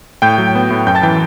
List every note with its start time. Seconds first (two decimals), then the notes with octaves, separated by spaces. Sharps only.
0.22 A2 G5 G6
0.38 F#3
0.55 B3
0.70 A2
0.87 F#2 G5 G6
0.95 A5 A6
1.03 E3 G5 G6